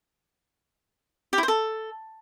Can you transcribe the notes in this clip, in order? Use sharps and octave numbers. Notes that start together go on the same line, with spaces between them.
G4
E4
C5
A4